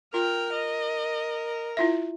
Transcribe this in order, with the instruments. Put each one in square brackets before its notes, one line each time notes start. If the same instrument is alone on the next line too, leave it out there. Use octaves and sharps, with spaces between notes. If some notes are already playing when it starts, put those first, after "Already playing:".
[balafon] F4 [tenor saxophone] A#4 [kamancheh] G5 F6
[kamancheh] D#5
[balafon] E4 F4 E5